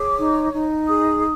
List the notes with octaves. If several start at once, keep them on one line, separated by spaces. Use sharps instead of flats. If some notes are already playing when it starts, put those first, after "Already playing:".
Already playing: G#4 C#5 D6
D#4
D#4
G#4 D#6